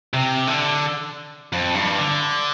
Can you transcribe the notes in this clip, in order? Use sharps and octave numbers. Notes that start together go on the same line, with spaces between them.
C3
D3
F2
G2
D3